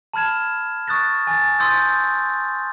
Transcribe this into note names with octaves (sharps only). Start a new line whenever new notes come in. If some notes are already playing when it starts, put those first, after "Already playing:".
A5 B5 F6 G#6 E7
C#6 D#6 F#6 A6 A#6
G#5 A6
C6 D#6 E6 G6 A6